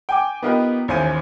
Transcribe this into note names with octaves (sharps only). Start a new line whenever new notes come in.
G5 G#5 D6
B3 D#4 F4 G4 A#4 B4
A1 D#2 C5 G#5 D#7